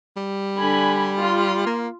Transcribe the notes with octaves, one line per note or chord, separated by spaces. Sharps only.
G3
D3 G#5 B5
F4
A#3